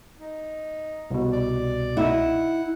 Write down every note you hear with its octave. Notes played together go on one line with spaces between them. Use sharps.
D#4
C2 B2
D5
D#4 E4 F#5